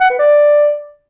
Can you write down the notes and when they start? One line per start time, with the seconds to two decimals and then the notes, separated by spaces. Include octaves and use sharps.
0.01 F#5
0.10 B4
0.19 D5